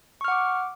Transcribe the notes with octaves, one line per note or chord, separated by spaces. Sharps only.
F#5 C#6 D6 F6